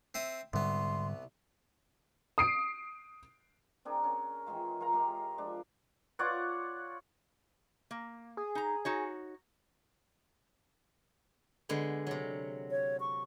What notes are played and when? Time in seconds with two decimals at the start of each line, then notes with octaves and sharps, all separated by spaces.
0.14 C4 E5 D#6
0.53 C2 G#2 D3 G3 B3 C6
2.38 D#6 C7 D7
3.85 C4 D4 G#4 A#4
4.04 C#4 A#4
4.47 D#3 E3 G#3 F4
4.81 F4 A#4 G#5 A#5
4.93 G#3 G4 A#4
5.38 F3 G#3 D4
6.19 F4 C#5 D5 F#5
7.91 A#3
8.37 G#4
8.55 D#4 A#5
8.85 D#4 F#4 C#5
11.69 D3 G#3 B3
12.07 C3 F#3
12.71 C#5
13.00 C#6